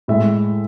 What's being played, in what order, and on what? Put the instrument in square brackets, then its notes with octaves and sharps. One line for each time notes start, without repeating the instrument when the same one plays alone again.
[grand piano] A2 G#3 E5